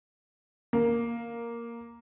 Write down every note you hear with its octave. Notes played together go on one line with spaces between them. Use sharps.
A#3